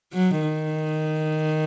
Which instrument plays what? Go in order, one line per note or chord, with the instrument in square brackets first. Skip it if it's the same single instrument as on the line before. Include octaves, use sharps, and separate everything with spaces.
[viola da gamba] F#3
D#3